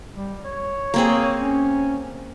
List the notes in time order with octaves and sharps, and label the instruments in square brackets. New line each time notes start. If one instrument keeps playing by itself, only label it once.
[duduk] G3
C#5
[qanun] A#3 C4 G#4
[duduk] C#4